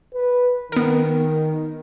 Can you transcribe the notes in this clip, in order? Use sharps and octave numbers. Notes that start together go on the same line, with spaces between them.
B4
D#3 B3 A#4